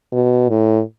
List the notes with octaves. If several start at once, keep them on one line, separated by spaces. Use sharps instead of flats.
B2
A2